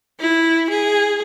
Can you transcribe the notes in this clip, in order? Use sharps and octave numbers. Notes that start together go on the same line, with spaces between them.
E4
G#4